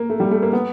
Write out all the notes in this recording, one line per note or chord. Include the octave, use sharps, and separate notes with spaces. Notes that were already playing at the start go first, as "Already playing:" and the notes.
Already playing: A#3
A3
G3
A3
A#3
B3